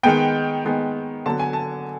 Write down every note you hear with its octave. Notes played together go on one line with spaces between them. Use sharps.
D#3 G#3 B3 G5
D#3 G#3 B3
D3 F#3 B3 A5
G#5
A5